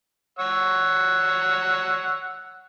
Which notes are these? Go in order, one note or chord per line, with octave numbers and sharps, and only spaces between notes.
C#5 F#5 E6